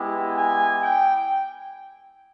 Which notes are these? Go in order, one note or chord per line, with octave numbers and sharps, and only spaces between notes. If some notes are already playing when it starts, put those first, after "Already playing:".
Already playing: G#3 B3 E4 G4
G#5
G5